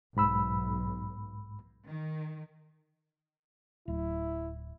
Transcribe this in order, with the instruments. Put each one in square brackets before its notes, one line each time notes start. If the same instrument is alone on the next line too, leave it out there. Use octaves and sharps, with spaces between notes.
[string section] B1 [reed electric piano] G#2 B5 E6
[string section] D#3
[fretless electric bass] D1 [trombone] E4